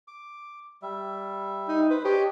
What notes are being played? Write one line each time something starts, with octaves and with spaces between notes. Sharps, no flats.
D6
G3 E5
D#4
B4 C5
D4 G4 C#5 D#5